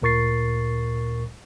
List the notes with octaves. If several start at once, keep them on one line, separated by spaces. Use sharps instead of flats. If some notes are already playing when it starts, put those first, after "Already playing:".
D2 A#2 A#4 C#6 A6 C7